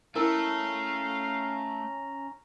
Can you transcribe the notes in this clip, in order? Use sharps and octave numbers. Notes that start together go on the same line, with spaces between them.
A3 C#4 E4 A#4 F5 G#5 A#5